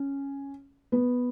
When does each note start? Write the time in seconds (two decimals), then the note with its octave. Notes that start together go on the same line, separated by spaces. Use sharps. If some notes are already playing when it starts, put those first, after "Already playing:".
Already playing: C#4
0.92 B3